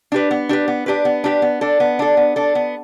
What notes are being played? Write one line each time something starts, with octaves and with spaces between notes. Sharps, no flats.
D4 G4 B4
B3
D4 G4 B4
B3
D4 G4 B4
B3
D4 G4 B4
B3
D4 A4
B3
D4 A4
B3
D4 A4
B3